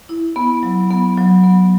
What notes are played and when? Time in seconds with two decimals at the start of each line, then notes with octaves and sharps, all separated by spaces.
0.09 E4
0.36 B3
0.63 F#3
0.91 B3
1.17 F#3
1.44 B3